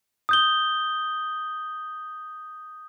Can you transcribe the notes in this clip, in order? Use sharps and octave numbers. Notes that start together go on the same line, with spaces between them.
D#6 G6 G7